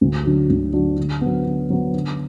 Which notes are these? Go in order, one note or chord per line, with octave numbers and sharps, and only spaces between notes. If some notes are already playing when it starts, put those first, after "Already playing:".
D2
D3 F#3 D4 F#4
D2
D3 F#3 D4 F#4
D3
F#3 B3
D3
F#3 B3
D3